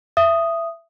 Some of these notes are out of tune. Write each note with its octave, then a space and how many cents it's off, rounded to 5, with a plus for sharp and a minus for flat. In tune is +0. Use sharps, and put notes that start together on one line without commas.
E5 +20 D#6 +0